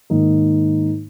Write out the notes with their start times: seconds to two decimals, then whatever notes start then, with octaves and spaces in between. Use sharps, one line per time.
0.10 G#2 D#3 A#3 D#4